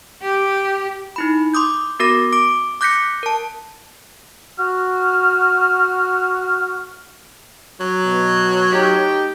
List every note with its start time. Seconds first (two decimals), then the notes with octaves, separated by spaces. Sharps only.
0.23 G4
1.16 D#4 E4 B5
1.54 C6 D6 D#6 G6
2.00 B3 F#4 A#4 D6 A#6
2.33 D6 D7
2.81 D6 F#6 G6 A#6 B6 C#7
3.23 A#4 A5
4.58 F#4 F6
7.80 F#3
8.06 B2
8.72 A3 D#4 G4